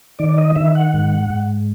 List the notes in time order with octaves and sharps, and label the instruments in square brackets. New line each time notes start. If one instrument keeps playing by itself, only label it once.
[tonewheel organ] D#3 D5
D5
D#5
D#3 E5
F#5
G#2
G#2